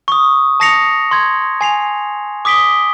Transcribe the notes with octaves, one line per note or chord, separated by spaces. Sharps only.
C#6 D#6
A5 D#6 A#6 C7 C#7 F7
C6 G#6
G#5 C7 F7
D6 D#6 B6 D7 G7